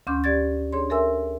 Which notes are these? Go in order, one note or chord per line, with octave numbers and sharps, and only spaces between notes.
D2 C#4 C6 D6 G6
G4 D5 G#6 A6
D4 G#4 C#5 C6
A4 A#4 E5 G#5 C6 E6